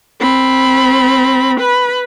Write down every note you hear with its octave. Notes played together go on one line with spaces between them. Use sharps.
C4 B5
B4 B5